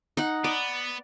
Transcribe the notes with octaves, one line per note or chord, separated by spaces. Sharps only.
D#4 F#5
B3 D5